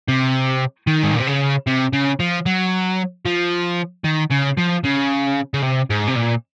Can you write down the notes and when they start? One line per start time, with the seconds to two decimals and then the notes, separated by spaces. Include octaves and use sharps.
0.08 C3
0.87 D#3
1.03 G#2
1.11 A#2
1.19 C3
1.27 C#3
1.67 C3
1.93 C#3
2.20 F3
2.46 F#3
3.25 F3
4.04 D#3
4.30 C#3
4.57 F3
4.84 C#3
5.54 C#3
5.63 C3
5.90 G#2
6.07 C3
6.15 A#2